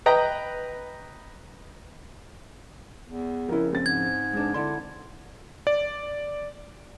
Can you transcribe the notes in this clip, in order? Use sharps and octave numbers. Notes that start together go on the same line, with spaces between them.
B4 D#5 G5 A#5
E2
F2 C#3 E4 A#4
C4 A6
G#2 G#6
G#3 D4
D3 E4 D5 C6
D5